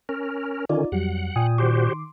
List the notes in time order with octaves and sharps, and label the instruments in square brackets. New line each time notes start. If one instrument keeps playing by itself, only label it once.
[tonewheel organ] C#4 A#4
[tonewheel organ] D3 D#3 C#4 [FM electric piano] D#4 F4 D5
[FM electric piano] F2 F#3 G3 [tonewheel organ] F#5
[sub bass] A#2 [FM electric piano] G5 G#5 D#6
[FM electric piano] D#3 C6 D6 [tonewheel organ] F#4 G4 C5